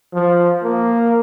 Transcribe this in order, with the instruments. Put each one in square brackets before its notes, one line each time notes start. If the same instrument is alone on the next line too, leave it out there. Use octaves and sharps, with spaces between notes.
[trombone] F3
A#3